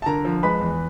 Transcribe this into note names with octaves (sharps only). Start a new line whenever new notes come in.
A5
D3 A#4 A#5
F3
G#3 B4 B5
E2